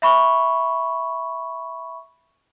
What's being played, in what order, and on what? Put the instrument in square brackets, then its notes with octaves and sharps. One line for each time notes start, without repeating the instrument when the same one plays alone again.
[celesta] E5 B5 C#6